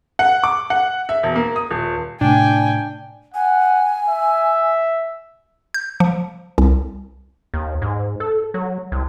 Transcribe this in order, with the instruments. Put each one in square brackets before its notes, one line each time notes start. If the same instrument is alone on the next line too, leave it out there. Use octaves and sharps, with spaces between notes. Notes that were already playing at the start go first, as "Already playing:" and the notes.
[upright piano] F#5
D6
F#5
E5
E1
A#3
D#6
D#1
[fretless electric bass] A2 C3 A3 [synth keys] D4 [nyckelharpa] G5 [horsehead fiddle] G#5
[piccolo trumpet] F#5 [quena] G#5
[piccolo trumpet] E5
[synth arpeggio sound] G6
F3
C2
[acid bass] D#2
G#2
A4
F#3
C2